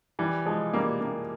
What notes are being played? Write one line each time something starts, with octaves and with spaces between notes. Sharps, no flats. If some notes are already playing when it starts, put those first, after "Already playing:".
E3 G3
F3 G#3
G3 A#3
G3 A#3